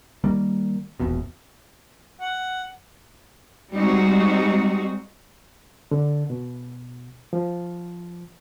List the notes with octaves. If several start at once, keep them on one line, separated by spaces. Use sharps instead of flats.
D#3 G3 A#3
E1 A#1 E2 B2
F#5
G3 G#3 C4 D#4 F#4
D3
B2
F3